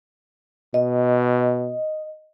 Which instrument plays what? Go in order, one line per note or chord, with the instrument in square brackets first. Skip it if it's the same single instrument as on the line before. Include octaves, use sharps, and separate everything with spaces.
[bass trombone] B2 [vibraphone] D#5